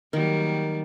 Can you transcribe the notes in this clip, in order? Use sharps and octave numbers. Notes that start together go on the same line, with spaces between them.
D#3 F#3 G3 A#3